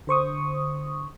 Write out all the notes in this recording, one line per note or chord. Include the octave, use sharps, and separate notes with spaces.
D3 C5 C#6 D#6